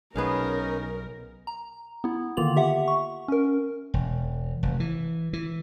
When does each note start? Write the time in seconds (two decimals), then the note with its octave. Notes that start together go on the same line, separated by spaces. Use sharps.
0.16 B1 B3 C#4 D#4 G#4 A#4 F5
1.47 A#5
2.04 B3 E4
2.37 D3 D#3 A#3 F4 F7 F#7
2.56 G4 E5 F#5
2.88 C#6
3.28 C#4 A#4
3.94 E1
4.63 F1
4.80 E3
5.33 E3